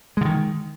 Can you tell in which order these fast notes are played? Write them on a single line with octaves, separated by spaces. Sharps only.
G#3 D3 D#3